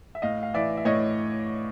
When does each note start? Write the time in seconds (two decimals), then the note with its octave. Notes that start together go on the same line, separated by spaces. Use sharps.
0.15 E5
0.22 A2 D#5 F5
0.43 F5
0.54 E3 D5 E5
0.77 E5
0.85 A2 C#5 D#5